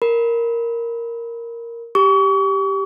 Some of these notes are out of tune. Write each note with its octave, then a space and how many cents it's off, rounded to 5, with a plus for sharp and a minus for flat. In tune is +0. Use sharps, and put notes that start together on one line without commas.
A#4 -5 B5 +0
G4 +0 C#6 +40